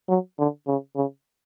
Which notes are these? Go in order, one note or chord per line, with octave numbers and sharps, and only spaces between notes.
F#3
D3
C#3
C#3